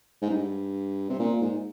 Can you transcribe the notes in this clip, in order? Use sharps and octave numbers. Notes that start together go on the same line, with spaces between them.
G#2
G2
C3
A#2
G#2